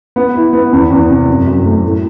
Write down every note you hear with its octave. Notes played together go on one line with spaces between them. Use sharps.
B3
E4
B3
E2
E2
C3
F#2
F#2
A3
A2